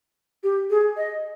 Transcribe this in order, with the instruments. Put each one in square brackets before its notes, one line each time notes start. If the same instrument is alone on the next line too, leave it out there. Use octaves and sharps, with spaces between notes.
[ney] G4
G#4
D#5